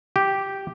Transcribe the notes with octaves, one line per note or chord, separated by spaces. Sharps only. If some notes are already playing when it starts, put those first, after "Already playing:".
G4